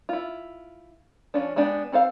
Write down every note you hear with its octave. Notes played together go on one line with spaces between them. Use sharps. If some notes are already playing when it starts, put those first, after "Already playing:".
E4 F4
F3 C#4 D4
G#3 B3 D4 G4
C4 A4 C5 F5